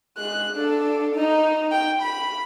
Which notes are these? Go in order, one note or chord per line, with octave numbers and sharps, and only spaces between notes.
G#3 F#6
D4 A4
D#4
G5
B5